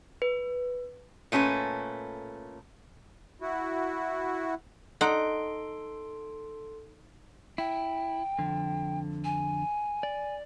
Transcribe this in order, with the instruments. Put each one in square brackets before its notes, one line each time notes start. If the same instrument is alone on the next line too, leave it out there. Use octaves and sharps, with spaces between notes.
[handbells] B4
[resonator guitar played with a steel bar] A#2 A3 C#4 E4 B4
[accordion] E4 F#4
[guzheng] D#4 F#5 [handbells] A4 C6 D7
[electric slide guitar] E4 [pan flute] G5
[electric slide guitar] F2 D3
[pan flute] G#5
[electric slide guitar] D5